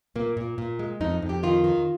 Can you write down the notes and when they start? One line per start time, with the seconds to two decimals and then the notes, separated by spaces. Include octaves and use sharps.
0.16 A#2 A#3
0.37 A#2
0.58 A#2
0.79 G#3
1.01 F2 D#4
1.22 F2
1.29 G4
1.43 D#3 F4
1.64 D#3